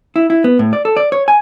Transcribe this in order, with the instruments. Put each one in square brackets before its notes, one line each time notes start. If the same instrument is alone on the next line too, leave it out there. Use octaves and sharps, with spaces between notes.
[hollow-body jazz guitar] E4
E4
B3
A2
D5
A4
D5
C#5
G#5